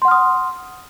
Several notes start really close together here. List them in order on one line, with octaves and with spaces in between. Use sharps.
C6 F#5 F6 D#6